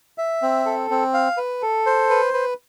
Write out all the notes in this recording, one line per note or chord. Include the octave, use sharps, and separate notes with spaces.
E5
C4
A4
C4
F5
B4
A4
C5
B4
B4